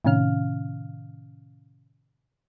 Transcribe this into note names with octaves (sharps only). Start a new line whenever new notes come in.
A2 C3 D#3 C#4 F5 F6